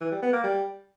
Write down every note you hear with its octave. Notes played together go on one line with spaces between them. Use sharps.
E3
G3
B3
A#3
G3